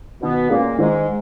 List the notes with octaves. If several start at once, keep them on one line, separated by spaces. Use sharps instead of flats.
B2 D#3 B3
A#2 G#3 A#3 C#4 G#4
G#2 D#3 G#3